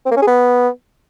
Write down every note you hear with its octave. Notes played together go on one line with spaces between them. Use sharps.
C4
A#3
C#4
G#4
B3